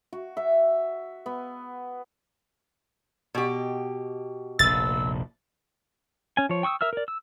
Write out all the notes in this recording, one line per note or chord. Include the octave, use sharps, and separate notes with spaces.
F#4
E5
B3
B2 G4
F1 A#1 E6 A6
C#4 G#5
F3 C#5
G5 C#6 D#6 E6
A#4 E5 E6 F6
A#4 D5
E6